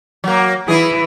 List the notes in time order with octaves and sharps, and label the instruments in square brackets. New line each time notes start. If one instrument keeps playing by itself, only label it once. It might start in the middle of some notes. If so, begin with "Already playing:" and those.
[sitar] F#3 A#3
[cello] E3 [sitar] E4 G#4